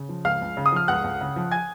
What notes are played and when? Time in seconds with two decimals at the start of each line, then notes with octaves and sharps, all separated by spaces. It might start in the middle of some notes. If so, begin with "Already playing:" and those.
Already playing: C#3
0.09 F3
0.24 C#2 F5 F6
0.41 C#2
0.57 C#3
0.66 D#6
0.72 F3 F6
0.88 C#2 F#5 F#6
1.04 C#2
1.21 C#3
1.36 F3
1.51 G#5 G#6